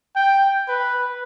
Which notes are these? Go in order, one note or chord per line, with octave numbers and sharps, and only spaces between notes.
G5
B4